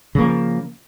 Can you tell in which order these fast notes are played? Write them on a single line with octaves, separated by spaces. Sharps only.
C#3 A#3 F3